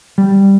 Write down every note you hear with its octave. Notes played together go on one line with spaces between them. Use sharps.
G3